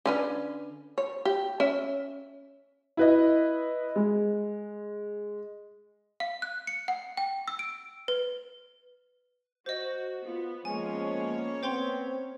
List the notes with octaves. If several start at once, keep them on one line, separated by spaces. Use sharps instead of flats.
D3 C#4 B4
C#5
G4
C#4 E5
E4 B4 D#5
G#3
F5
F#6
C#7
F#5
G5
E6
D7
B4
F#4 C5 D#5
B3 F4
F3 G#3 A#3 B3 C#4 C#5 G#5
B3 C4 C5 G5 C6